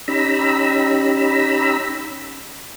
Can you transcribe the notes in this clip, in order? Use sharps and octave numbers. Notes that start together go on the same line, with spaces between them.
C#4 D#4 G4 A#5 B5 E6